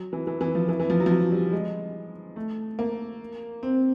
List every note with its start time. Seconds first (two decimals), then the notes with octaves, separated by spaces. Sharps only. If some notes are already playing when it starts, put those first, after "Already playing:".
Already playing: F#3
0.13 E3
0.27 E3
0.41 E3
0.55 F3
0.69 E3
0.80 E3
0.90 F3
1.00 F#3
1.06 F3
1.10 F#3
1.32 G3
1.53 G#3
2.36 A3
2.79 A#3
3.63 C4